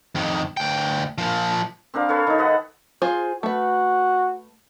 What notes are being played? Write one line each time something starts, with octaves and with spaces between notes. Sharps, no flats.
F2 D#3
D2 G5
A#2 F3
C4 D4 A#4 F5
A4 B4 C#5
D#3 D#4
B4 D#5 F#5
F4 G#4 C5
A3 F#4 B4